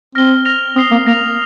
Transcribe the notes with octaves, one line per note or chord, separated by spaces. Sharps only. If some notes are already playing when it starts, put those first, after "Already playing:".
C4 F6 A#6 G7
F6 A#6 F7
C4 D#6 C7 G7
A#3
A#3 A#6 F7